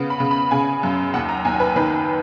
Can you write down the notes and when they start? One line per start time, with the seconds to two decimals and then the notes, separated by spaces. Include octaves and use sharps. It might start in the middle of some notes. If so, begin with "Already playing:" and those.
Already playing: C#3 B3
0.10 B5
0.20 C#3
0.31 B5
0.51 C#3 G#5
0.83 F#2
1.14 D#2 F#5
1.29 A#5
1.45 D#2 G#5
1.60 B4
1.76 D#3 B4